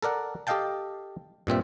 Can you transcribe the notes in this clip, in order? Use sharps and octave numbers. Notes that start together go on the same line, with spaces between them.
A4 A#4 D5 F#5
G4 A4 D#5 F5 G5 A5
G2 A#2 C4 E5